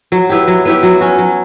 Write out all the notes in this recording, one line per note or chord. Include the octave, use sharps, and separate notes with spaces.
F#3
B3 E4 G4
F#3
B3 E4 G4
F#3
C#4 F#4
F#3